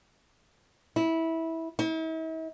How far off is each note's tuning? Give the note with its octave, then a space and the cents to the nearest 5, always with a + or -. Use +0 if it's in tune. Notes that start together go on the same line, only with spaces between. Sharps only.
E4 -15
E4 -45